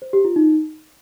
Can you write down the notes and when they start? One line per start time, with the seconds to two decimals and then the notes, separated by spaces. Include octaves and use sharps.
0.02 C5
0.13 G4
0.25 F4
0.36 D#4